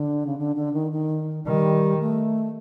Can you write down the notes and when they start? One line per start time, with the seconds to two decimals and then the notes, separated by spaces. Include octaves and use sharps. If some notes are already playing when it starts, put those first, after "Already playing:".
Already playing: D3
0.26 C#3
0.38 D3
0.56 D3
0.73 D#3
0.91 D#3
1.45 D#3 G3
2.00 A3